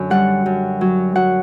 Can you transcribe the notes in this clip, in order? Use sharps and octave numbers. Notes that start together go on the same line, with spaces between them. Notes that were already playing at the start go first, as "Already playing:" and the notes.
Already playing: F#2 D3
G3 F#5
F#2
F#3
F#3 F#5